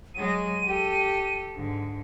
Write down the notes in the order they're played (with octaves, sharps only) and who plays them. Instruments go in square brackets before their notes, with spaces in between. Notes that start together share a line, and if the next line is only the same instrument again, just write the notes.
[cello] F#3 G#3 [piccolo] D#7
[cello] G4 A4
G#2 D3